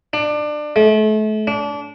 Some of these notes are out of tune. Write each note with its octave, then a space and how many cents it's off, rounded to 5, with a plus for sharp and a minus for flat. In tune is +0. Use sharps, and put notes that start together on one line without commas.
D4 +25
A3 -35
D4 -25